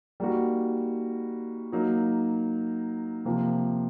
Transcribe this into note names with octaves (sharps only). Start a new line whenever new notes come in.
G3 A#3 D#4 F#4
F#3 A#3 D#4
C3 F3 A#3